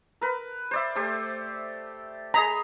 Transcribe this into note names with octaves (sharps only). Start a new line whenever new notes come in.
A#4 B4
C5 D5 E5
A3 G4 C5
G#4 D#5 A#5 B5